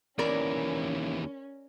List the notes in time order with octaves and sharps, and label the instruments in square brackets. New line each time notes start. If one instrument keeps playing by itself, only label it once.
[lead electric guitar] D#2 E3 [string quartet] C#4 [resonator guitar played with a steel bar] A#4 D5